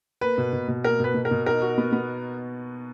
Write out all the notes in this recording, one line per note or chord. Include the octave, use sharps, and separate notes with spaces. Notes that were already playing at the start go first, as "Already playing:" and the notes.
A#3 B4
B2
B2
B2
A#3 A#4
B2 B4
B2
A#4
B2
D#4 A#4
F#4
B3
B3